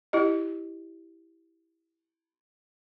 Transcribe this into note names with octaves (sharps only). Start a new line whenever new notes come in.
E4 G4 D#5